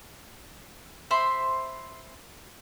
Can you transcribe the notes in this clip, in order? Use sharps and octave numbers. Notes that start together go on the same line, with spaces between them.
C5 E5 B5 C6